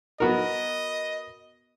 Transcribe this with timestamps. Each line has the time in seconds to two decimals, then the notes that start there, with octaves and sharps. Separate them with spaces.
0.20 B3 F#4 A#4 D#5